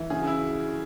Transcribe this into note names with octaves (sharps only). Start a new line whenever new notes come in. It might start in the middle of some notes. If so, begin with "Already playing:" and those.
Already playing: E3
C#3 G#4
F#4
E4